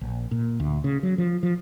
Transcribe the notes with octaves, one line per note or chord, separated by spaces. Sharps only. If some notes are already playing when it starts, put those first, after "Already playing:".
A#1
A#2
D2
C#3
F#3
F3
F3